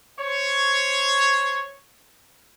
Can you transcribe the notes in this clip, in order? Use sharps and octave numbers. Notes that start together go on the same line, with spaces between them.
C5 C#5